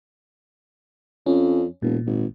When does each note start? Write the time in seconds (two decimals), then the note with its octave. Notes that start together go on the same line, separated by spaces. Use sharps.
1.26 F2 C#4
1.82 E1 A#2
2.06 G#1